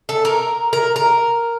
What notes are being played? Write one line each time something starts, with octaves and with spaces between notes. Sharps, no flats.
A4
A#4
A#4
A#4